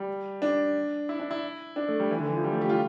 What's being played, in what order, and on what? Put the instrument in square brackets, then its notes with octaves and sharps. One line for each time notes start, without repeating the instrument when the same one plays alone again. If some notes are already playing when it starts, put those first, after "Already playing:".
Already playing: [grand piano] G3
D4
E4
D4
E4
D4
A3
G3
E3
D3
E3
F3
G3
A3
G4
F4